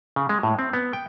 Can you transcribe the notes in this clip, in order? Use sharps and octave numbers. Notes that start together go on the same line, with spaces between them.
C#3
G#3
A2
C4
B3
G5